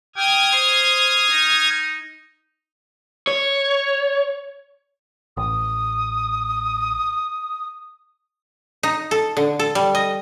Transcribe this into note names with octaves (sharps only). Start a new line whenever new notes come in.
G5 D#6 F6 G#6
C5
D#4
C#5
A1 D#6
D#4
A4
D3
A4
G3
D#5